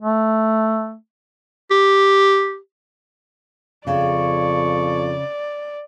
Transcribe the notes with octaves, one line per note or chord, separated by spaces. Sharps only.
A3
G4
F2 C#3 D5 C#6